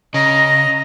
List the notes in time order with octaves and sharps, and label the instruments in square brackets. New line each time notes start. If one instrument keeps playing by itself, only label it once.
[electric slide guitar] C#3 [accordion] D#5 [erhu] A#5